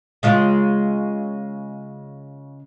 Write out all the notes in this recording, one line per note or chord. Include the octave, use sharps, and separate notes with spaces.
C#3 G#3 F4